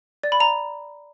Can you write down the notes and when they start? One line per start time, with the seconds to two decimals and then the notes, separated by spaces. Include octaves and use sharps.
0.24 D5
0.32 B5
0.40 A#5